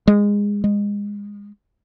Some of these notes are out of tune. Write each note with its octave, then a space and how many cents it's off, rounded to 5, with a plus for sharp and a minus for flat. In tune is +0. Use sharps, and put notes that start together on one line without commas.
G#3 -20
G#3 -25